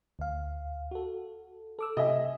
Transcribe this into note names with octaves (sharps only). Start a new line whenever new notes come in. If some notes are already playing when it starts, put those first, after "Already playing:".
D2 F5
F#4 A4
A4 D6 E6
C3 D#5 E5 G#5